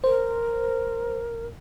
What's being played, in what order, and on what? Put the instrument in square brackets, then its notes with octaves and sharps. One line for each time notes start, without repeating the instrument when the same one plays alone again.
[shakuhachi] A#4 [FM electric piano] C5